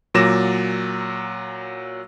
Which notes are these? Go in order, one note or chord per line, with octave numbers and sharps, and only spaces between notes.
A#2 F#3 D6 A#6 E7